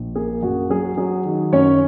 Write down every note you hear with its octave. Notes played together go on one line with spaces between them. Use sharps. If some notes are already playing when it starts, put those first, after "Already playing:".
Already playing: A#1
A#3 G#4
F#2 F#4
F#3 G#4
F#3 G#4
D#3
F#2 C#4 C#5